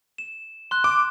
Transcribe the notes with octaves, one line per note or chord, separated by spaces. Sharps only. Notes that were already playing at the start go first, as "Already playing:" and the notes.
E7
C6 F#6
D6